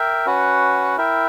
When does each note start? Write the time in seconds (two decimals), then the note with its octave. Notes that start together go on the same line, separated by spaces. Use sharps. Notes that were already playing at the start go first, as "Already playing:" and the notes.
Already playing: A#4 E5 G5
0.26 C#4 F#4 B4 F#5
0.97 E4 A#4 E5 G5